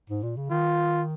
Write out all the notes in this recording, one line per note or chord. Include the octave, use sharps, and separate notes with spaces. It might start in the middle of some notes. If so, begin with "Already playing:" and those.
G#2
A#2
C#3
D#3 F4